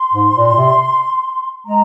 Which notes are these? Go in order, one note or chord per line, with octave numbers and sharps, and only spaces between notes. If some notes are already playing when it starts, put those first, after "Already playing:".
Already playing: C6
G#2
A#2
A#2
C3
G#3 A#5